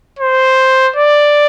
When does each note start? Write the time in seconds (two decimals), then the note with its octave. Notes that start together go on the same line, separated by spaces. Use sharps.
0.19 C5
0.96 D5